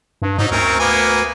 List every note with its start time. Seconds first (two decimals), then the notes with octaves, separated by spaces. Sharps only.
0.22 G2
0.38 G#2 F#3 D#4
0.51 D2 C4 C#4 A#4
0.80 A#3 B3 G#5